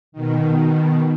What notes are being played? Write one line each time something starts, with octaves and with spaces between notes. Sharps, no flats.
B2 D#3